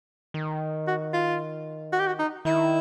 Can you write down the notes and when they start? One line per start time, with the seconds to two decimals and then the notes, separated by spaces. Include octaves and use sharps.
0.34 D#3
0.87 F#4
1.13 F4
1.93 F#4
2.00 G4
2.07 F#4
2.19 D#4
2.45 D#3 E4